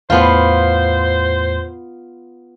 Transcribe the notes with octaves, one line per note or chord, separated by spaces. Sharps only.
E2 A2 B3 F4 C5